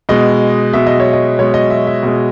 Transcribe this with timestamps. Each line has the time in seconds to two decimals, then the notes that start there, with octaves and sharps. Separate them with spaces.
0.09 B2 G#3 D#5
0.73 B2 G#3 E5
0.87 D#5
1.00 C#5
1.13 D#5
1.39 B2 G#3 C#5
1.54 D#5
1.70 E5
1.87 E5
2.03 B2 G#3